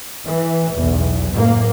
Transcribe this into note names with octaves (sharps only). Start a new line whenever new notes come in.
E3
B1 E2
F#1 A2 A#3